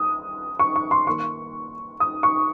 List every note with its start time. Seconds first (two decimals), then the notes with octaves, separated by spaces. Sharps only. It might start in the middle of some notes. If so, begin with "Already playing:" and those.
Already playing: D#6
0.59 C#6
0.76 C#6
0.91 C6
1.06 D#3 A#3 C#6
2.00 D#6
2.23 C#6